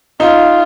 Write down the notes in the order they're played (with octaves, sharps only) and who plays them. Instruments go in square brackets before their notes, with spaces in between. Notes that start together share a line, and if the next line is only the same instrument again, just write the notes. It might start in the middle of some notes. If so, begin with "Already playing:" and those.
[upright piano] D#4 [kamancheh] F4